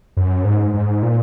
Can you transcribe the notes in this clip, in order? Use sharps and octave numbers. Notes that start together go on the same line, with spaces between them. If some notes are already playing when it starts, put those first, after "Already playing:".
F#2
G#2
G#2
A#2